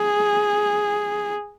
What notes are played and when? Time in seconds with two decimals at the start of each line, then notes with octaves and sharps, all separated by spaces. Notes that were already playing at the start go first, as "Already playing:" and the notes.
Already playing: G#4